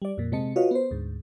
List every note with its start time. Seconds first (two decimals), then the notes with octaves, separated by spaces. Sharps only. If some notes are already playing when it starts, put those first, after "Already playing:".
0.02 G3 D5
0.18 F2 A#2
0.32 C3 G#3 C4 D#5 A5 C#7
0.56 F4 F#4 B4 C#5 D#5 F5
0.71 B3 C5
0.91 D2 G#2